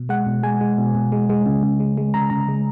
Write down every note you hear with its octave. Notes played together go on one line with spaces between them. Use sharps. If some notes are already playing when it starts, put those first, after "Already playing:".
Already playing: B2
G#3 F#5
B2
G#3 G#5
G#3
B2
B2
G#3
G#3
C#3
C#3
G#3
G#3
C#3 A#5
C#3 A#5
G#3